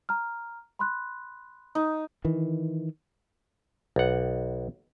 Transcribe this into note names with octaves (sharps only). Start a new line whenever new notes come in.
A#5 F6
B5 C6 F#6
D#4
D#3 E3
B1 F#5